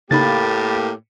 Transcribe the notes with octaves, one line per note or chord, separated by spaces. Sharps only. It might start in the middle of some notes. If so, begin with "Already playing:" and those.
A2 C#3 A#3 D#4 G4 B5 A6